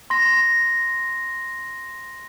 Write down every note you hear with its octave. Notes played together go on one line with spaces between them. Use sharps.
C6 A#6